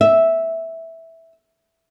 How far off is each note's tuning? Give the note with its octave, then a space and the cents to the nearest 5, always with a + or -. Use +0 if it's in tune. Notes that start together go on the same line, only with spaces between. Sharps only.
E5 -5